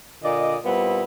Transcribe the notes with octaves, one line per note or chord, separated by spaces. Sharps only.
A#2 D3 D5 D#5
A#2 G3 B3 C4 E4